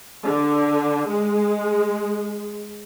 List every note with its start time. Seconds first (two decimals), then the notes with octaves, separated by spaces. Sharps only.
0.24 D3
1.07 G#3